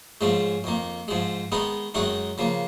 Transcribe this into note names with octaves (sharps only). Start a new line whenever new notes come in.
G#2 F3 G#3 C#4
F2 D#3 A#3
G#2 F3 G#3
D#3 G#3 B3 D#4
F#2 D#3 G#3 D#4 F#4
C#3 F3 A#3